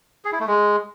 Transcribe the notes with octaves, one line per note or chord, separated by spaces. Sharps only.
G#4
E4
A3
G#3